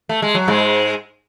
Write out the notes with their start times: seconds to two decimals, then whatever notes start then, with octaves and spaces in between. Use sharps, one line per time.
0.09 A3
0.22 G#3
0.35 F#3
0.48 G#2 G#3